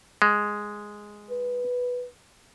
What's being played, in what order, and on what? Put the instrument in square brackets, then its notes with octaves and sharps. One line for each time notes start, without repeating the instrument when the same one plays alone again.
[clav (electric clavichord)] G#3
[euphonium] B4